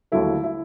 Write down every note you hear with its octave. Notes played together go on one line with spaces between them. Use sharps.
D#2 D3 F#3 A3 E4
E4